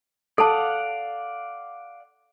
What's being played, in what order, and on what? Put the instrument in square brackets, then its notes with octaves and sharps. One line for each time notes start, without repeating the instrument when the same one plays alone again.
[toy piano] A4 A5 [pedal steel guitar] D5 F5 F#5